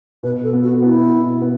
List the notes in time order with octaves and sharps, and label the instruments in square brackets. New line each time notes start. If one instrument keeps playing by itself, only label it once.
[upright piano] B2 [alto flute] B4
[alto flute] A4
[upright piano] B3
[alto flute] F#4
[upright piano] B3 [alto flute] E4
[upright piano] B2
B3